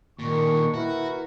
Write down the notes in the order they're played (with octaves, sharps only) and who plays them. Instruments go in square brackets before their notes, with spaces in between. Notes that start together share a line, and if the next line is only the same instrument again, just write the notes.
[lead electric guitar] D#2 A#2 [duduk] D#3 [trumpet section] D4 C#6
[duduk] E4 [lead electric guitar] F#4 [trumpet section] A#4 B4